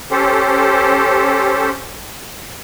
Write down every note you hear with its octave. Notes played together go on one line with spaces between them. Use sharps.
C#4 G4 A4 C5